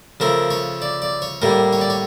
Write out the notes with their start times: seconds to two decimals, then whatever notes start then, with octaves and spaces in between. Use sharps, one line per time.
0.20 C#3 F3 A3 A#4
0.51 C#5
0.82 D5
1.02 D5
1.22 C#5
1.42 A2 G3 A#3 A#4
1.73 C#5
1.81 D5
1.90 C#5